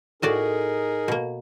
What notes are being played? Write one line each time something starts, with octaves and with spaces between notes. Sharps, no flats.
A2 D#4 F#4 G#4 A#4 D5
B2 A#3